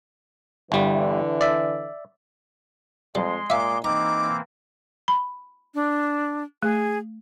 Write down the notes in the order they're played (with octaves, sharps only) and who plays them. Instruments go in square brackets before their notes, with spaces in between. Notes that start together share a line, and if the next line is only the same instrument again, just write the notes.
[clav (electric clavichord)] G1 G3 [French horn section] D3 E3
[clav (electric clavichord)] D5 E5
[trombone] F2 [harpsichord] G3 [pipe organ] G#3 C6
[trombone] A#2 [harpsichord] E5 F5 [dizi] D6
[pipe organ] E3 A#3 C4 [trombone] D#4 [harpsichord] A#5 [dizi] D6
[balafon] B5
[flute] D4
[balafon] A3 [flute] G#4